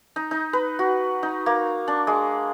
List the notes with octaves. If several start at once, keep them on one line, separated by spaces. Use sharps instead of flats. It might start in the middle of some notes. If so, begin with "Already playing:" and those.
D#4
D#4
B4
F#4
D#4
A#3
D4
G#3